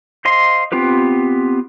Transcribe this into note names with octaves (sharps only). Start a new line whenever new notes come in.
C5 D#5 F5 C6
B3 C4 F4 G4 B4